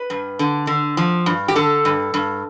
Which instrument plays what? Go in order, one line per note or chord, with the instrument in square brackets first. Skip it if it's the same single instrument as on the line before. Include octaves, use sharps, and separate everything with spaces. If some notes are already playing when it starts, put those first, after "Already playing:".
Already playing: [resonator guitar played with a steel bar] B4
G2
D3
D3
F3
G2
G4
D3 A4
G2
G2